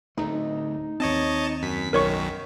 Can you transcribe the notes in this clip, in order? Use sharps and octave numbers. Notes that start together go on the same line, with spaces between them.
D1 D2 A3 D#4
D#2 C4 C#5 D#5 A5
F#2 B6
B1 F#2 D#3 A#4 C#5 C#6